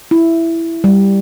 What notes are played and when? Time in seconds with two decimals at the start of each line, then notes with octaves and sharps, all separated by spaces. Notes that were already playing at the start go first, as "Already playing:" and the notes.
0.11 E4
0.84 G3